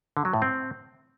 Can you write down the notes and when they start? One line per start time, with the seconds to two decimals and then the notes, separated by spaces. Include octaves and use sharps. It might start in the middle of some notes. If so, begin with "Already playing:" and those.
0.17 D3
0.25 F#3
0.33 A2
0.42 C4